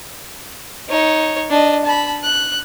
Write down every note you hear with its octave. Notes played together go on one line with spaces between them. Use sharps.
D#4 C#5
D4 D#5
A5 B5
F#6